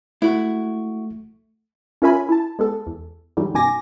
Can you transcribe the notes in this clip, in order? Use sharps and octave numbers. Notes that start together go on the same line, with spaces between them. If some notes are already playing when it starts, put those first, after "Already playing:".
A3 E4 F#4
C#4 F4 A#4 E5 G#5 B5
E4 A5
G#3 B3 A4
E2
G#2 D3 E3 F#3 G3
F#2 B2 D#3 G#5 D6 A#6